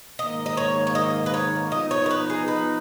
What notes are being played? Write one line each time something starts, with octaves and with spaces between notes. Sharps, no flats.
G#2 D#3 A#3 D#5
D#5
C#5
C#5
D#5
B4
C#5
F3 B3 D#4 D#5
C#5
A#4
B4
G#4
B4